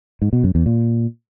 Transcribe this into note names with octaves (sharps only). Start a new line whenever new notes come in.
G#2
B2
F#2
E2
A#2